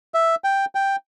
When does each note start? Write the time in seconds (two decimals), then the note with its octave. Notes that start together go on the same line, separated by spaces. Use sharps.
0.14 E5
0.44 G5
0.75 G5